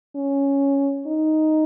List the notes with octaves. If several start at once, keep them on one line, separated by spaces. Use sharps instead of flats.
C#4
D#4